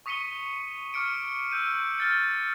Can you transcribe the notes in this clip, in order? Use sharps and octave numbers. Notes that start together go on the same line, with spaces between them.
C#6 D#6 B6 C#7 D#7 G7
C#6 D6 F6 C#7 D7
E6 G6 D#7
F6 A6 C#7